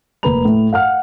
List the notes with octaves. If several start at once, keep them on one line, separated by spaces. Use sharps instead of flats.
F1 A#3 B4 A#5 B5 F7
A2
F5 F#5 F6